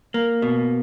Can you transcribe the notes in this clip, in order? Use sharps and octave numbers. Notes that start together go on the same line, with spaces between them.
A#3
B2